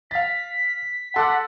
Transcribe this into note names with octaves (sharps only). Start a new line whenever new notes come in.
F5 A6 B6
A4 F#5 C6 D6 F#6